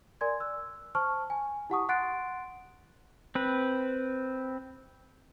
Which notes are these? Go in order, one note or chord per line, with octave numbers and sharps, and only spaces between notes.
A#4 D5 G#5 C6 G#6
E6 F#6
C5 A5 C#6 F6
G#5
E4 G4 F#5 A5 C#6 D#6
F#5 C6 F#6 A6 C7 D7
C4 B4